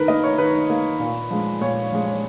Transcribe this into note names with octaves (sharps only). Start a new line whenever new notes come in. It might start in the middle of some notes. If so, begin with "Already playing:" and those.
Already playing: D#3 A#4 B4
A#3 D#5
C#5
D#3 B4
A#3
A#2
F3 G#3
A#2 C#5
F3 G#3
C#5